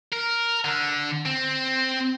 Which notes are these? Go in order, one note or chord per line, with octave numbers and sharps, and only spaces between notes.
A#4
D3
C4